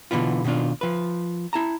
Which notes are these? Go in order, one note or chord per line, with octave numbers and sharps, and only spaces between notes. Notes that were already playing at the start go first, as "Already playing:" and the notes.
B2 D3 E3 B3 F4
B2 D#3 C#4 D4 F4
F3 B4
E4 A5 A#5